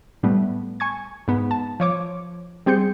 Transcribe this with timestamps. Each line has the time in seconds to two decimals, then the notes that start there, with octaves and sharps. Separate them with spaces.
0.23 A2 G3 A3 B3
0.80 G#5 C#6 G#6
1.28 G#2 B3
1.51 A5
1.80 F3 C#5 D6
2.66 G3 C4 G#4 G6 C#7